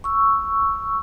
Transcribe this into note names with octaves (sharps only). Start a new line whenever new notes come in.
C#6 E6